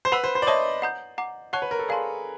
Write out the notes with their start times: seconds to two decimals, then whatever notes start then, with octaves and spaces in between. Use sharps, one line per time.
0.05 C5
0.12 B4 F#5 B5 E6
0.24 C5
0.35 C5
0.42 D5
0.47 C#5 D#5 E5 A5 C#6
0.82 F#5 A#5 D#6 G6
1.18 F#5 A#5 D6
1.53 C#5 F#5 A5 C#6 F#6
1.62 B4
1.71 A#4
1.79 A4
1.88 G#4 D5 F5 A5 C6